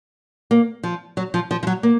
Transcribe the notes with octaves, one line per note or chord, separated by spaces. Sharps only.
A#3
F3
F#3
F3
F3
F3
F#3
A#3